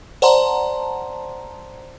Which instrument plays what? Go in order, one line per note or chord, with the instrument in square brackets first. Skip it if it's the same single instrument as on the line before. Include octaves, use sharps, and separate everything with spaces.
[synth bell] C5 D5 F#5 A5 A#5 C6